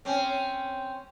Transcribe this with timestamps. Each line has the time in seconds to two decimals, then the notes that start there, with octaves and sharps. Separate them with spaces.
0.05 C4 C#4